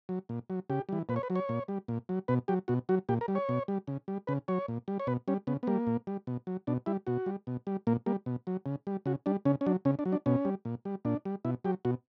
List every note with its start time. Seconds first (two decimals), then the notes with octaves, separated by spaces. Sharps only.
0.09 F#3
0.29 A#2
0.50 F#3
0.70 C#3 G4
0.89 E3 G3
1.09 A#2 B4
1.16 C#5
1.23 B4
1.30 F#3
1.35 C#5
1.49 A#2
1.68 G3
1.88 A#2
2.09 F#3
2.28 B2 B4
2.48 F#3 G4
2.68 B2 F#4
2.89 F#3 F#4
3.09 A#2 G4
3.21 A#4
3.28 G3
3.35 C#5
3.49 B2
3.68 G3
3.88 C#3
4.08 G3
4.27 C#3 B4
4.48 F#3 C#5
4.68 A#2
4.88 G3
5.00 C#5
5.07 B2 B4
5.28 G3 C#4
5.47 C#3 B3
5.63 B3
5.67 G3 A#3
5.87 A#2
6.07 G3
6.27 B2
6.47 F#3
6.67 B2 D4
6.86 G3 E4
7.07 B2 F#4
7.26 G3
7.47 B2
7.67 G3
7.87 A#2 A#3
8.06 G3 A#3
8.26 B2
8.47 F#3
8.66 C#3
8.87 G3
9.06 C#3 F#4
9.26 G3 D4
9.45 C#3 C#4
9.61 C#4
9.66 F#3 D4
9.85 C#3 C#4
9.99 D4
10.05 F#3
10.12 D4
10.26 B2 C#4
10.45 G3
10.65 A#2
10.85 G3
11.05 A#2 D4
11.25 G3
11.45 B2 E4
11.64 F#3 G4
11.85 B2 F#4